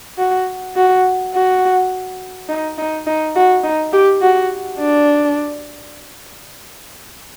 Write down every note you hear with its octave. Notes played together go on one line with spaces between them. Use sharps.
F#4
F#4
F#4
D#4
D#4
D#4
F#4
D#4
G4
F#4
D4